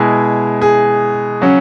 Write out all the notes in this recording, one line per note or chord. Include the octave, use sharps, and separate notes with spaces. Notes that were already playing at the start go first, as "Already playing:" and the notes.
Already playing: B2 G#3 E4 G#4
G#4
C#3 F#3 C#4